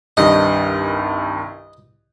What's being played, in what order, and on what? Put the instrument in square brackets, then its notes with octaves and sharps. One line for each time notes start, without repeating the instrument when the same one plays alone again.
[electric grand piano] C2 G2 D#3 [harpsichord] D#5